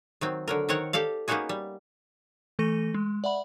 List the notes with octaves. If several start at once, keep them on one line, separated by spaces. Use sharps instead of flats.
D#3 F#3 C4
D3 F#3 A#4
D#3 C4 A#4 C#5 F#5 A#5
G4 A4 D5 F5
A#3 B3 C#4 D#4 F#4 G#4
G3
E3 A3 A4 C#6 A#6 D#7
G#3
D5 E5 F#5 B5 F#7